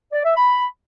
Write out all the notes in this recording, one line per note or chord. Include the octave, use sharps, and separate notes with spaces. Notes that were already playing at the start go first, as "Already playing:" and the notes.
D5
E5
B5